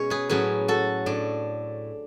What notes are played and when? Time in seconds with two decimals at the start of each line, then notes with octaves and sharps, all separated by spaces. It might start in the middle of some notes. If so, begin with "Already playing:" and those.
Already playing: B2 G#3 C#4 C#5
0.10 G#4 B4
0.29 A2 F#3 C#4 G#4 B4
0.68 F#4 A4
1.06 A2 D4